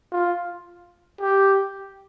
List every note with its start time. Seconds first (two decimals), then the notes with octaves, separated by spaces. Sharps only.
0.12 F4
1.20 G4